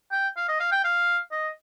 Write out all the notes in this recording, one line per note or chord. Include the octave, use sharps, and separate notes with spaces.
G5
F5
D#5
F5
G5
F5
D#5